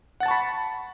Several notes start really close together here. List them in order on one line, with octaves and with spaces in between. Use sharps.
F#5 A6 A5 C#6 B5